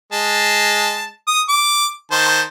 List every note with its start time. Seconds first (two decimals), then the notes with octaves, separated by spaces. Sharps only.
0.13 G#3 A5
1.27 D#6
1.49 D6
2.11 D#3 C5 A5